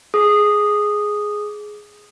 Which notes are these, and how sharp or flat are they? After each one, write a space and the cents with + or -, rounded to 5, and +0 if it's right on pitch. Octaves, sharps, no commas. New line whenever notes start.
G#4 +5 D#6 -10